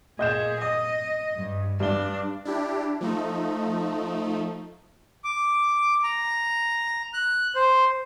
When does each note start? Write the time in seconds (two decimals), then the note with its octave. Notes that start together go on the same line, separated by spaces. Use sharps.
0.19 A#2 G#4 D#5 G6 E7
0.62 D#5 D#6
1.35 G2
1.80 G2 D4 G7
2.45 D4 E4 G4
3.01 F3 A3 D#4
5.24 D6
6.04 A#5
7.14 F#6
7.56 C5